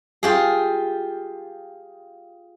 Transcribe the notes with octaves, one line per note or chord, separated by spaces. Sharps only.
F4 G4 G#4